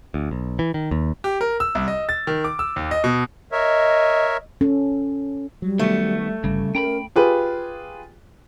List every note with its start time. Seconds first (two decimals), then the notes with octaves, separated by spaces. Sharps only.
0.14 D2
0.31 B1
0.59 E3
0.74 D#3
0.91 D#2
1.24 G4
1.41 A#4
1.60 E6
1.75 C2
1.88 D#5
2.09 A6
2.27 D#3
2.44 D6
2.59 E6
2.76 D#2
2.91 D#5
3.04 B2
3.52 A#4 C#5 D#5 E5
4.61 C#4 A4
5.62 F#3 G3
5.79 D#3 A3 B3
6.44 G1 C#3 G3
6.75 C#4 A#4 G5 A#5 B5
7.16 F4 G4 G#4 B4